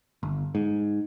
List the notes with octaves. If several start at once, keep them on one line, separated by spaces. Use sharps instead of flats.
G1
G#2